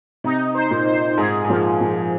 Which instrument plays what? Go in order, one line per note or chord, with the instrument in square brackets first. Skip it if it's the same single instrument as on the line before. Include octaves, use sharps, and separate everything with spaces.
[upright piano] C3 [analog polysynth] D#4
[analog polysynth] C5
[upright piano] A#2
[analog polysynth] C5
[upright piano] G#2 [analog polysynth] G#4
[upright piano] G#2
[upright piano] A#2 [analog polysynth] F3
[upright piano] A#2 [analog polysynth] F3